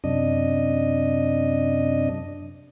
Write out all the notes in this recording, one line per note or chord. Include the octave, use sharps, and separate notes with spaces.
F#2 C3 D4 D#5